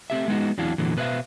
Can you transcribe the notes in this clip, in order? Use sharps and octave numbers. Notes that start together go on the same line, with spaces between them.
A3 C4 G4 E5
G#3 B3 D#4 F#4
E2 F#3 C4 D4 E4 F5
E2 A#2 D3 E3 F#3
B2 B4 C5 E5 F5